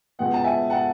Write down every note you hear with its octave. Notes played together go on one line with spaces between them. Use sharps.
C#2 B2 G#3 B3 F#5
A5
E5 G#5
F#5 A5